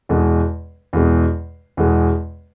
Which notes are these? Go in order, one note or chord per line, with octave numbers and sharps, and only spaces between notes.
E2 B2 G#3
E2 B2 G#3
E2 B2 G#3